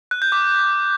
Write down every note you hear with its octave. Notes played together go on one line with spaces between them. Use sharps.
F#6
G6
D6